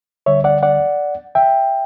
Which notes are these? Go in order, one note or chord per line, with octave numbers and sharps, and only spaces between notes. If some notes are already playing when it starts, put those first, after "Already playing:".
D2 D3 G3 C#5 E5
D5 F#5
D5 F#5
E5 G5